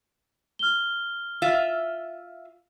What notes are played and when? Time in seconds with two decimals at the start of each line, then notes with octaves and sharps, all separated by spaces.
0.59 F6 G7
1.42 F4 E5